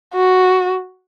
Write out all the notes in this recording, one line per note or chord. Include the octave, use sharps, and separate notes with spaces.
F#4